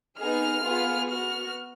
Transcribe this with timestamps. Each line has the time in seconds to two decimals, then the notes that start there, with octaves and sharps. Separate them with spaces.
0.19 B3 D#4 G#4 F6
0.64 B3 F4 G#4
1.10 B3 F#4 F6